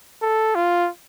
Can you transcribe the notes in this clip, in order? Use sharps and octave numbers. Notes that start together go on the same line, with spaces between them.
A4
F4